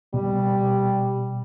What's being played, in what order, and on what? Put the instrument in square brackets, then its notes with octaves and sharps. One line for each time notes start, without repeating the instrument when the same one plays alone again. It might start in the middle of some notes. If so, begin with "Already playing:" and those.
[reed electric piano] B2 [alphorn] G3